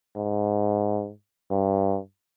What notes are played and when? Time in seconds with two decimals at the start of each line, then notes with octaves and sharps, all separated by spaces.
0.16 G#2
1.51 G2